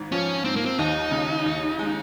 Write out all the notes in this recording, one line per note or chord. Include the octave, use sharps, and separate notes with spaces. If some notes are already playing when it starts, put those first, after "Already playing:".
Already playing: G#1 G#2
F3 C#4
G#2 C4
A#3
C4
D#2 D#4
C#3
D#2
G#3